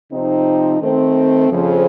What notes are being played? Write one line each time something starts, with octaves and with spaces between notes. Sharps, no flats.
C3 F3 C4 D#4
D#3 A3 C4
F2 C#3 F3